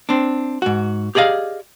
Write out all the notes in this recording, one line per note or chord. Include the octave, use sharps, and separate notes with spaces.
C4 D4
G#2 F#4
G4 G#4 D5 D#5 F5